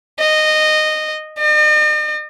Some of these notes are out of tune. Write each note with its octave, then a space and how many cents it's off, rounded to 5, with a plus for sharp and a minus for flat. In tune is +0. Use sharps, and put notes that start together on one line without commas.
D#5 -15
D#5 -45